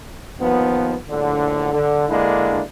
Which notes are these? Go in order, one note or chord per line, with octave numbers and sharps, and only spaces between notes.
D#2 F3 B3
A#1 A2 D3
D3
D3 G#3 A#3 D4 E4